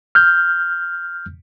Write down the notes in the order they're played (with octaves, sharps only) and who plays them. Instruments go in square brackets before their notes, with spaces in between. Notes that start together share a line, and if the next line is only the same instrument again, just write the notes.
[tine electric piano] F6 G6